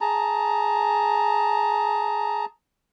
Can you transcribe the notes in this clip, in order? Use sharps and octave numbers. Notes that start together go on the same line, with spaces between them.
G#4 A5 A#5